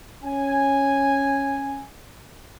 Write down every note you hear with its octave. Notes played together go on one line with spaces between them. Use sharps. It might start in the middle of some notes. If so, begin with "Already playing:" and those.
C#4 G#5